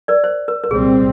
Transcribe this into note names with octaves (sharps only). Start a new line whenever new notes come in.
A#4 D5
C5
A#4
A#4
C2 A#2 G3 C4 G#4